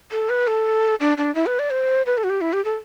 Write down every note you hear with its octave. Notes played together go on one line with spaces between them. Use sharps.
A4
B4
A4
D4
D4
E4
B4
D5
C5
B4
A4
F#4
G4
E4
G4
A4